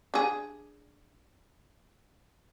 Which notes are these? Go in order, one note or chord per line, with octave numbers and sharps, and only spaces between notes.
D4 G#4